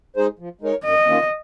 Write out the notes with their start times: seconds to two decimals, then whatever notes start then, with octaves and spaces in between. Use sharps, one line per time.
0.16 G#3 D#4 G#4 C5
0.39 F3
0.61 G#3 D#4 A#4 C#5
0.84 F#2 D#5
1.07 D#3 A#3 C#4 F4